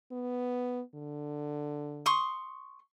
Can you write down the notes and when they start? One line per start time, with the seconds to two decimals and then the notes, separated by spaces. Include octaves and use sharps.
0.12 B3
0.95 D3
2.06 C6 C#6 D#6